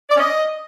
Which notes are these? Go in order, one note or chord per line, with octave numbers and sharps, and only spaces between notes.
D5
C#4
D#5